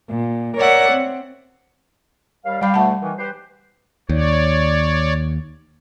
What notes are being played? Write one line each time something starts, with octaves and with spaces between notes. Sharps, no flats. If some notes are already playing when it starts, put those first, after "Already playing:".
A#2
A#4 C#5 D5 E5 F#5 F#6
C4
D#2 G3 F5
G3 D5 F5 G5 B5
D2 B2 A3 F#5 A5
D#3 E3
G4 B4 C5
D#2 C#5 D5